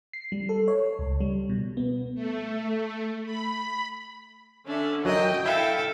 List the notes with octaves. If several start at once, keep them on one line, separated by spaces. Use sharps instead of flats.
C7
G3
A4
C#5
C#2
G3
B2
B3
A3
B5
D3 C#4 D4 E5
F#2 F#3 D#5 G5
E4 A4 E5 F5